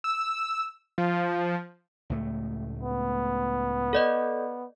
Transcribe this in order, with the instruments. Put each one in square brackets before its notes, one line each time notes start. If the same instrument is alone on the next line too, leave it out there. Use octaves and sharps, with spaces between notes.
[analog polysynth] E6
F3
[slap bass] C#2 A2 A3
[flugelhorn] B3
[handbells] A4 D5 D#5